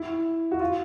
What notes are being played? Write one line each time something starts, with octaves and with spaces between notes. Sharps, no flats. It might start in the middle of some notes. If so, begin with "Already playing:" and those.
Already playing: E4
F#4
F4